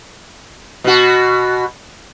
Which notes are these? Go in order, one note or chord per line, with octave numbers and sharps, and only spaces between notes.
B2 F#4